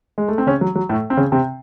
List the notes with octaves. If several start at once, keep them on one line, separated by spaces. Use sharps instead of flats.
G#3
A3
C4
C#3 C#4
F#3
F#3
A2 A3
C4
C#3 C#4
C3 C4